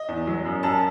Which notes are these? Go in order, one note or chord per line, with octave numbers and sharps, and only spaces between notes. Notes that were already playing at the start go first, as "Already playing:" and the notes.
Already playing: D#5
E2
F#3
F#2
F#2 A5